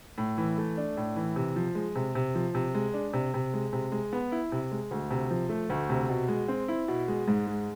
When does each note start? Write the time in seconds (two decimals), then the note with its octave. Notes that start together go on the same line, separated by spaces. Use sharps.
0.18 A2
0.38 E3
0.58 A3
0.77 D4
0.97 A2
1.16 E3
1.36 C3
1.56 F3
1.75 G#3
1.95 C3
2.15 C3
2.35 F3
2.55 C3
2.75 G#3
2.94 D4
3.13 C3
3.34 C3
3.54 G#3
3.73 C3
3.92 G#3
4.13 B3
4.32 E4
4.52 C3
4.72 G#3
4.91 D2
5.11 C3
5.31 F3
5.49 A3
5.70 D2
5.90 C3
6.09 B2
6.28 G#3
6.48 C4
6.68 E4
6.88 B2
7.08 G#3
7.28 G#2
7.47 G#3